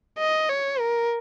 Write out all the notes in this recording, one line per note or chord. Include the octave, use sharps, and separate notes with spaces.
D#5
C#5
A#4